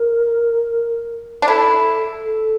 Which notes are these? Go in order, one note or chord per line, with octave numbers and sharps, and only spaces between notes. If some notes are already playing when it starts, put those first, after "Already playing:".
Already playing: A#4
D4
E4 A4
A4